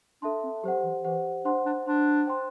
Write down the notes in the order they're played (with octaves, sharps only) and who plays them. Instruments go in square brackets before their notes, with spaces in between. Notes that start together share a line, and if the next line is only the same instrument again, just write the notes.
[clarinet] D4 [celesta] A4 E5 A5 C6
[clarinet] C4
[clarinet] F#3 [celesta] G4 C5 F#5
[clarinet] E3
[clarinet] E3 [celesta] G4 C5 F#5
[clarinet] D4 [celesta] C5 F#5 C6
[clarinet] D4
[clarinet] D4 [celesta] C5 F#5 C6
[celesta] C5 G5 C6